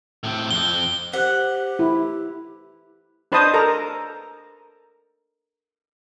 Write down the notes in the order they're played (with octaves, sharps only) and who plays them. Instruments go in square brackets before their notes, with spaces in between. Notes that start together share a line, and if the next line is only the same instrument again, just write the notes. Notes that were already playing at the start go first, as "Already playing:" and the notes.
[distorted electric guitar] A2 C4
[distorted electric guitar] F2 C4 [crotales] G7
[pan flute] G4 [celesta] C5 F#6 [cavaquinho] F#5
[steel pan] E4
D4 B4 C5 D#5 A5 D#6
A4 A#4 A#5